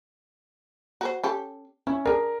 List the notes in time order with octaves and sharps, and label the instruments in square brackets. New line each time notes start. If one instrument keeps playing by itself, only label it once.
[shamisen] F#4 A#4 C5
C#4 G4 A4
[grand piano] C#4 [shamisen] E4
[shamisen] D4 G#4 [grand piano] A#4